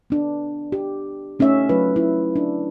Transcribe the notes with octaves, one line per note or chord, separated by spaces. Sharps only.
B3 D4
G4
A3 C#4 D#4 C#5 E5
F#3 A3 F4 B4
E4
D4